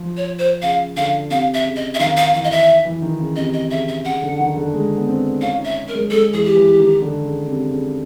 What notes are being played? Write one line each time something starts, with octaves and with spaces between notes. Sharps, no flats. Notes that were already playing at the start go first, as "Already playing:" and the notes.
Already playing: F3
C#5
C5
C#3 F5
D3 F5
C3 F5
E5
C#3
D#5
E5
D#3 F5
F5
E3 F5
D#5
E5
E3
D#3
C#3
C3 D#5
D#5
C#3 E5
E5
C#3 F#5
D3
D#3
D3
G#3
B3
C4
C#4 F5
D#4
E5
A#4
G#3
G#3 A4
E3 G#4
G4
E3
D#3
D3
C#3
C3
C#3